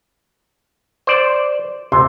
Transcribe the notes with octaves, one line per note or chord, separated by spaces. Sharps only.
C5 D5
C3 C6